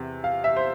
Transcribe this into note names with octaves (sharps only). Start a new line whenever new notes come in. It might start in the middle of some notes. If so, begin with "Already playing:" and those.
Already playing: E2 C3
F5
E5
C5